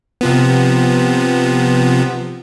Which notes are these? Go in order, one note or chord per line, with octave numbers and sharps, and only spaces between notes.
C3 F3 B3